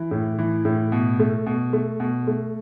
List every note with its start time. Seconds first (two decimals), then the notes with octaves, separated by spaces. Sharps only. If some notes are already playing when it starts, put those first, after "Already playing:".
Already playing: E3
0.11 A2
0.38 E3
0.65 A2
0.92 B2
1.19 A3
1.46 B2
1.73 A3
2.00 B2
2.27 A3